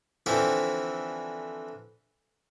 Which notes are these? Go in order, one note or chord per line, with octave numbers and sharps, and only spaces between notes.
D3 E3 F3 C4 E4 A4